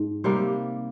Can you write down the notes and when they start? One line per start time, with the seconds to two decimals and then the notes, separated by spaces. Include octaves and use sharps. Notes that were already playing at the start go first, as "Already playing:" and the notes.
Already playing: G#2 D#4
0.24 C3 G3 A#3